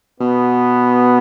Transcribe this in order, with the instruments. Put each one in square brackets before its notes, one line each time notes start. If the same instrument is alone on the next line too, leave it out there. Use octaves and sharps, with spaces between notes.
[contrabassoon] B2 [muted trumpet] B3